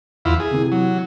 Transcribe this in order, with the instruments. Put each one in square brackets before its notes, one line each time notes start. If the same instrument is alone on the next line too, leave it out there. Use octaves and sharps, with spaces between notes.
[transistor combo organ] E2 E4 F4
G#4
[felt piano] C3 E3
[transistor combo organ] F#3